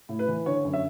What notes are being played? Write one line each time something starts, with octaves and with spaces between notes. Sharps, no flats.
A2
B4
E3
D3 C#5
F#2
E5